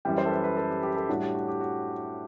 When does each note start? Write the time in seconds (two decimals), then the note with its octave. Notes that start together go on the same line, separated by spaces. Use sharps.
0.05 F#2 E3 G3 G5
0.18 C5
0.26 A4
0.31 B4
0.44 B4
0.57 A4
0.70 G4
0.83 G4
0.96 A4
1.09 A2 G3 D4 F#4
1.22 G4
1.35 F#4
1.48 G4
1.61 F#4